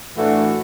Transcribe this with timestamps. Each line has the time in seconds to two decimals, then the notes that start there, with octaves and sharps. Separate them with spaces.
0.16 A2 E3 A3 D4 F#4